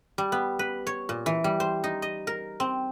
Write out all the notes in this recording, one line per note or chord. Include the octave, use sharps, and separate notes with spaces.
G3
B3
B4
C#5
A#2
E3
G3
C5
D#4
D#5
A#4
C4